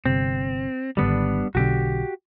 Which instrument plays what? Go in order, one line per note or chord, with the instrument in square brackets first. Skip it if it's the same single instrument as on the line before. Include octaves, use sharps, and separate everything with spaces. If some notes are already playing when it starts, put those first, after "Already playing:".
[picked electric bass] G1 C3 [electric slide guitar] C4
[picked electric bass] G#1 D3 [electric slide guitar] G3 B3 D4
[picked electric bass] B1 B2 D3 [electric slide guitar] F#4 G4